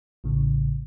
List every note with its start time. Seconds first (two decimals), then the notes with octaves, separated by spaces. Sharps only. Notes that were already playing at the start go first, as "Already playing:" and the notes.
0.24 A1 A2 C#3